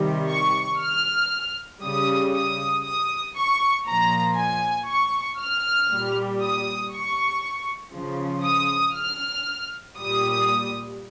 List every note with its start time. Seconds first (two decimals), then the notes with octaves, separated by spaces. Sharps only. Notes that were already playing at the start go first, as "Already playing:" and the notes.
Already playing: C3 D#3 G3
0.30 C#6
0.81 F6
1.83 C#3 G3 D#6
2.34 D#6
2.85 D#6
3.36 C#6
3.88 A#2 F3 A#5
4.37 G#5
4.89 C#6
5.40 F6
5.90 A#2 G3
6.42 D#6
6.93 C#6
7.94 C#3 F3
8.45 D#6
8.96 F6
9.98 A#2 G3 D#6